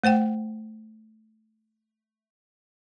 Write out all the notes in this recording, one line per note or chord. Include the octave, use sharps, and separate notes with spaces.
A3 C5 F#5 G5